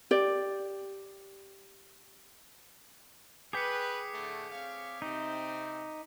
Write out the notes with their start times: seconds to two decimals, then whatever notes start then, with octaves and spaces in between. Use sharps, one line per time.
0.11 G4 D5
3.53 G#4 B4 G5 D6 B6 C#7
4.12 A2 D3 A3
4.51 C4 C#5 F5
5.02 C3 C4 D#4